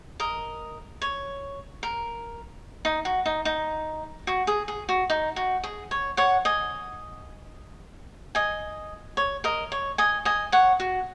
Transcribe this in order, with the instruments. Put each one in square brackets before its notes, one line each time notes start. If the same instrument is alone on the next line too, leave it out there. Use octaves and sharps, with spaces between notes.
[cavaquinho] A#4 D#5
C#5
A#4
D#4
F#4
D#4
D#4
F#4
G#4
G#4
F#4
D#4
F#4
G#4
C#5
C#5 F#5
D#5 G#5
D#5 G#5
C#5
A#4 D#5
C#5
D#5 G#5
D#5 G#5
C#5 F#5
F#4